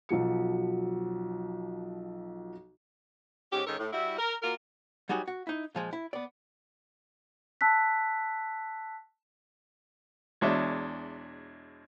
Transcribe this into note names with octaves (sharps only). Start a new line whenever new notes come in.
B1 F3 F#3 C#7
G#2 C#4 G4
G#2 D#3 C#4 A4 A#4 C#5
A2
G3 E4 F#4
A#4
A#3 F4 F#4 A#4
F#3 G3 D#4 F#4 G#4
F#4
D#4 E4
A#2 F3 G#3
E4
B3 D5
A5 E6 F#6 B6
E2 B2 G#3 D4 C#5 E5